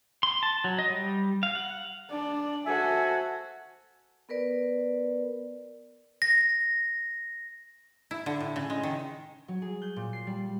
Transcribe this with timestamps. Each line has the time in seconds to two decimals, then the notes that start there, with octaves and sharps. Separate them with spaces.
0.23 C6
0.43 A5
0.64 F#3
0.79 D#5
0.90 G3
1.43 F5
1.55 F#5
2.10 D4 D5
2.66 F#4 A4 C5 E5 G#5
4.29 B3 A#4 B4 D5
6.22 A#6
8.11 E4
8.26 D3
8.40 A2
8.56 C#3
8.70 G#3
8.83 D#3
9.48 F#3
9.62 G#4
9.82 G6
9.96 A#2
10.13 C7
10.27 G3